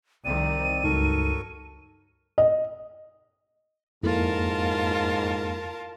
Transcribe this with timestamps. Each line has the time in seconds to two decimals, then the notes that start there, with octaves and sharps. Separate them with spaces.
0.25 C2 D#3 C4 D5 D#7
0.84 C#2 G2 F#3 D#4 A4 A#4 C#6
2.38 D#5
4.03 F2 G#2 A#3 E4 F4 A4 A#4 A5